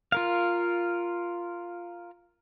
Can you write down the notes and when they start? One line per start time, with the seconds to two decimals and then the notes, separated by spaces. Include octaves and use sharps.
0.12 F4 A#4 F5